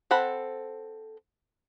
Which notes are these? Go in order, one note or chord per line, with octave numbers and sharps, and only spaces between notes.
C4 A4 F#5 B5